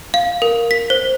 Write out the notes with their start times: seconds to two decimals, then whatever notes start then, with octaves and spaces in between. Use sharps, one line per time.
0.14 F5
0.42 A#4
0.71 B6
0.90 C5